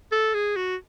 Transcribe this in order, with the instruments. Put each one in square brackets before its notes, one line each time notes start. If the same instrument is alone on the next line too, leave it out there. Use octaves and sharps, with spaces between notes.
[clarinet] A4
G#4
F#4